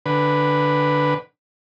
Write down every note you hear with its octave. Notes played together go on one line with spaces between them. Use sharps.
D3 B4